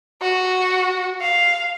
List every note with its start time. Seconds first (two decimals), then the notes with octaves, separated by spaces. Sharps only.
0.22 F#4
1.21 F5